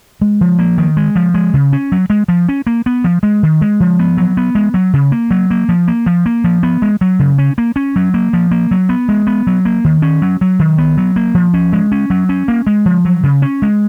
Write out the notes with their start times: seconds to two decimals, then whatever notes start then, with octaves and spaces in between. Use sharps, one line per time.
0.21 G#3
0.41 F3
0.59 A#3
0.78 D#3
0.97 G#3
1.16 F3
1.34 G#3
1.54 C#3
1.73 C#4
1.92 F#3
2.10 G#3
2.28 F3
2.49 C#4
2.67 A#3
2.86 B3
3.04 F3
3.23 G#3
3.43 D#3
3.61 G#3
3.80 F3
3.99 B3
4.17 F#3
4.37 B3
4.55 G#3
4.74 F#3
4.93 C#3
5.12 A#3
5.31 F#3
5.51 A#3
5.69 F3
5.88 A#3
6.06 F3
6.26 A#3
6.44 F3
6.63 B3
6.82 G#3
7.01 F#3
7.19 C#3
7.38 C#4
7.58 A#3
7.76 C#4
7.96 F#3
8.14 A#3
8.33 F3
8.51 A#3
8.71 F#3
8.89 B3
9.09 G#3
9.27 B3
9.47 F#3
9.65 A#3
9.84 D#3
10.02 C#4
10.22 F#3
10.41 F#3
10.59 D#3
10.78 B3
10.97 F#3
11.16 A#3
11.34 F3
11.54 C#4
11.73 G#3
11.92 C#4
12.10 F#3
12.29 C#4
12.48 A#3
12.67 G#3
12.86 F3
13.05 F#3
13.23 C#3
13.42 C#4
13.62 G#3